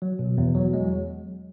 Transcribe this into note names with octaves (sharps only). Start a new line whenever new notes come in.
F#3
B2
E2
F#3
G#3